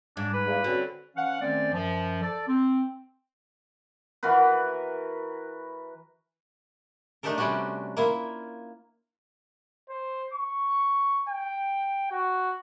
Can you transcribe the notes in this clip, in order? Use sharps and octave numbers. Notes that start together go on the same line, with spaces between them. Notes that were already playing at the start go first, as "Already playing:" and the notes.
G#2 D4
B4
E2 A#3
D3 C4 C#4 F#4
E3 C#4 F5 F#5
D#3 A3 C4 C#4 C5 D5
F#2 F3
A4 D5
C4
E3 F#4 A#4 B4
A3 D4 D#4 G4 A4 A#4
C3 G3 C#4 D4 F#4
A#3 E4 F4
C5
C#6
G5
F#4